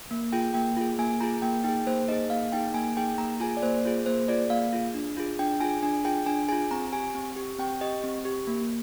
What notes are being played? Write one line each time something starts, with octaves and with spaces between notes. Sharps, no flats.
A#3
F4 G#4 G5
A#3 G5
F4 G#4
A#3 G#5
F4 G#4 A#5
A#3 G5
D#4 G#4 G5
A#3 C5
D#4 G#4 D#5
A#3 F5
D#4 G#4 G5
A#3 G#5
D#4 G#4 G5
A#3 A#5
F4 G#4 G#5
D5
A#3 C5
F4 G#4
A#3 C5
F4 G#4 D5
A#3 F5
F4 G#4
D4
F4 G#4
D4 G5
F4 G#4 G#5
D4 G#5
F4 G#4 G5
D4 G#5
F4 G#4 G#5
C4 A#5
G4 G#5
C4
G4
C4 G5
G4 D#5
C4
G4
A#3